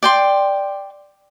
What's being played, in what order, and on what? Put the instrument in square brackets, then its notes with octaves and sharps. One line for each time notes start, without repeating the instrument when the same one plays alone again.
[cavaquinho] D5 G5 C6